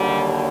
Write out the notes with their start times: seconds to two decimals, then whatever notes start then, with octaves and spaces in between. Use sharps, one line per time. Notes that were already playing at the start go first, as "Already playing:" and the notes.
Already playing: D#2 D3 F#3 G3